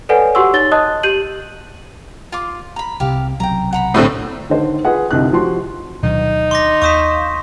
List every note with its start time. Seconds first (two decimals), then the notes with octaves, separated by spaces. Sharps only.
0.09 A4 B4 C#5 D5 F#5 G#5
0.35 F#4 G4 F#5 C6 C#6 E6
0.53 D#4 C#5 A6 G7
0.71 D#5 A5 D#6 F#6
1.03 G4 G6 D#7 F#7
2.32 F4 C6 D6
2.76 A#5 B5
3.00 C2 C3 G4 F5
3.40 B1 C3 F#3 G5 A#5
3.73 F#5 A#5 B5
3.94 A2 D3 C4
4.50 D3 D#3 C5
4.85 F4 G#4 B4 F#5
5.11 C2 D3 D#4 F#6
5.32 F3 F#4 G4 C6
6.03 D2 B2 D#3 F#3 D#4
6.51 C6 D6 A#6
6.82 D#2 F5 C#6 D#6 G6 B6 E7